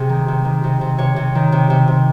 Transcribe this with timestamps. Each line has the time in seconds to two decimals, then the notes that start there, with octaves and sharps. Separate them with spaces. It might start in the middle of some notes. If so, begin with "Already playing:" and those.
Already playing: C3 G#4
0.09 D#3
0.28 C3
0.45 D#3
0.64 C3
0.81 C3
0.98 C3 C#5
1.16 C3
1.35 D#3
1.52 C3
1.70 C3
1.88 C3